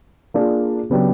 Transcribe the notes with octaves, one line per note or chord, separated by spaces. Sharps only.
A#3 D4 F4 G#4
C#3 F#3 B3 D4 G4